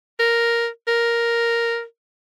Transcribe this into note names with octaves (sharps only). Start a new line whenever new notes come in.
A#4
A#4